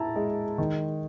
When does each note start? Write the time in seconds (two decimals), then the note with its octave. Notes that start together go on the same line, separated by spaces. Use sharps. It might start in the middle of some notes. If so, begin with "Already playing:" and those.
Already playing: E4 A5 A#5
0.16 G#3
0.58 D#3